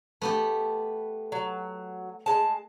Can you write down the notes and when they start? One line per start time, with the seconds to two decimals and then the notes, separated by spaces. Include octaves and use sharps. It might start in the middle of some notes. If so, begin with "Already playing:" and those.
0.22 A3 B3 G4 B4
1.32 F#3
2.26 G#3 A5